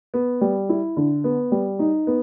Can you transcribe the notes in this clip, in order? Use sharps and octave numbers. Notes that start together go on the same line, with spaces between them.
B3
G3
E4
D3
B3
G3
D#4
B3